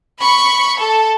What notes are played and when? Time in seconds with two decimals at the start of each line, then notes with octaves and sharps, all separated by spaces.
0.20 B5 C#6
0.78 A4